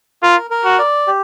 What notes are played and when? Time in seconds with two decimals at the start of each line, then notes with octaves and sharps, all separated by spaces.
0.22 F4 A#4
0.51 A#4
0.65 F#4
0.79 D5
1.07 G4